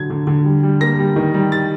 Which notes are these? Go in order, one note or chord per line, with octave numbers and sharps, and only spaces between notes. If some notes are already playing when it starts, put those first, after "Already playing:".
Already playing: D3 F#3 G#6
D3
D3
G3
G3
A#3 A#6
G3
D#3
G3
A6